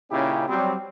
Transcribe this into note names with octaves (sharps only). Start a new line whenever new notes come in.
A#2 C#3 C#4 D#4 E4 G4
F#3 G3 C4